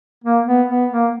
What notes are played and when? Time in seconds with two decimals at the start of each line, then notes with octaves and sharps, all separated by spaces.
0.24 A#3
0.46 B3
0.69 B3
0.91 A#3